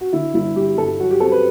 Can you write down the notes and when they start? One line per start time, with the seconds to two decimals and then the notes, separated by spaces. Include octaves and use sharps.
0.01 F#4
0.13 D3 E4
0.34 G1 E4
0.56 G1 G4
0.77 G2 A4
0.99 F#3 F#4
1.11 G4
1.20 C4 A4
1.31 B4